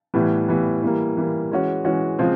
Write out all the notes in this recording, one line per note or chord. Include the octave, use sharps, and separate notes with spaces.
A2 E3 G3 B3
A2 E3 G3 B3
E3 G3 A#3
E3 G3 A#3
E3 G#3 C#4 F#4
E3 G#3 C#4 F#4
C#3 F3 G#3 C4